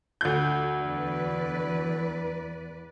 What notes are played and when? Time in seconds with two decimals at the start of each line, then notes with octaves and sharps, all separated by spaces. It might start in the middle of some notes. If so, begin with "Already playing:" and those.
0.21 D2 G6
0.80 E2 B4 D5